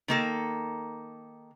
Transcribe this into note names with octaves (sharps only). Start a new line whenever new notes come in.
D#3 A#3 A4